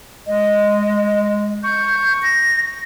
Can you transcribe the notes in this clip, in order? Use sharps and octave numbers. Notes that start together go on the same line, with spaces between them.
G#3 D#5
C#6 G6
A#6